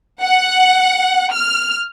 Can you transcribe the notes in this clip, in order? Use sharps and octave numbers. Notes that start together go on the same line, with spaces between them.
F#5
F6